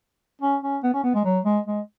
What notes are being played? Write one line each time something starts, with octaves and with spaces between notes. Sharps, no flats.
C#4
C#4
B3
C#4
B3
G#3
F#3
G#3
G#3